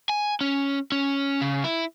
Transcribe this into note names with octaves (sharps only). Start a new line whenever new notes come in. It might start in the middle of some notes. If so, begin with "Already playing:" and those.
G#5
C#4
C#4
C#3
E4